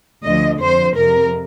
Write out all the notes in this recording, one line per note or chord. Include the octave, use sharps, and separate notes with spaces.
D2 D3 F3 D#5
F2 D3 F3 C5
F2 C3 F3 A#4